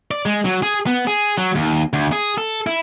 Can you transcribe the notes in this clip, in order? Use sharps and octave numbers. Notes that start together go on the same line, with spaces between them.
D5
G#3
F#3
G#4
B3
G#4
F#3
D#2
D2
G#4
A4
E4